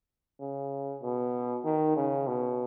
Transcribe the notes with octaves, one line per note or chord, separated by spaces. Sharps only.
C#3
B2
D#3
C#3
B2